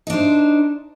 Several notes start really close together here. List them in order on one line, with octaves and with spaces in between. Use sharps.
D#4 D4 C5